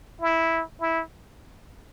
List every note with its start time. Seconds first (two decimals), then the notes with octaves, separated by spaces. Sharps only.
0.22 E4
0.81 E4